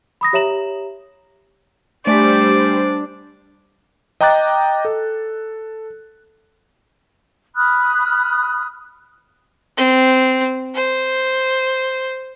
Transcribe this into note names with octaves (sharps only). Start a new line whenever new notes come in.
B5 D#6 A#6
G4 C#5 E5 A#5 E7 F#7
G3 A3 D4 C5 D5 G#5 B6
D#5 G5 A#5 D6 F#6 A6
A4
B5 D#6 F6 F#6
C4
C5